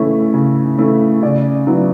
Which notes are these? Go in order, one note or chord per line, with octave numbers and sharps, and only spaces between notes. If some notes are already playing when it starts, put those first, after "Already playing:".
Already playing: C#3 E3 A3 C#4 E4
C#3
E3 A3 C#4 E4
C#3 D5
F#3 B3 E4